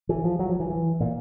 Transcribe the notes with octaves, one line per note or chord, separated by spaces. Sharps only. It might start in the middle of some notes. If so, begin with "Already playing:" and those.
E3
F3
F#3
F3
E3
E3
A#2